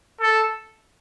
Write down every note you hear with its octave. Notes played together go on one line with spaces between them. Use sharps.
A4